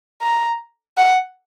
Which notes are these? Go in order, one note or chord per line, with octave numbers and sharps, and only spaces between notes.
A#5
F#5